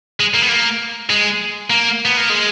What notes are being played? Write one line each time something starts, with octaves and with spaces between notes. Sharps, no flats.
G#3
A#3
B3
A#3
G#3
A#3
B3
A#3
G#3